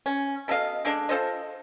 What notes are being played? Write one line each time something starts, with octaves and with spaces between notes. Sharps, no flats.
C#4
B2 A4 D#5 F5
D3 G#3 D4
F4 A4 C5 D#5